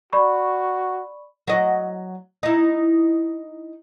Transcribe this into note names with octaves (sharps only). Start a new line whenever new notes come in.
F#4 D5 B5 C#6
F#3 D#5
D#4 E4